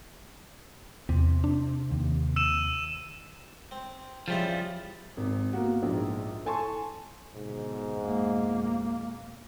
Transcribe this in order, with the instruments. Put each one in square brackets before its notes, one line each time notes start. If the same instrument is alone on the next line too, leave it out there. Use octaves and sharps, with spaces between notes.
[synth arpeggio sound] E2 [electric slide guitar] C3
[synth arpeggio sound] D4
[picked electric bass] D#2
[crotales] E6 D#7 E7
[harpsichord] C4
[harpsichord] C#3 C4 E4 [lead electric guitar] F3 G3
[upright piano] G#1
A#3 B3 F#4
A#1 G#2
A4 G#5 A5 C6 C#6
[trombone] G#2 [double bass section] B2 D3
[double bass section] F2 B2 G#3 [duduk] A#3